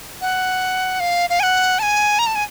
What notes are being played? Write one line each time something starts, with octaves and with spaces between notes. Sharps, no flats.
F#5
F5
F5
G#5
F#5
A5
G#5
A#5
A5
G#5